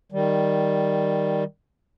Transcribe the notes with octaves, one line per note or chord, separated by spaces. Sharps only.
D#3 G3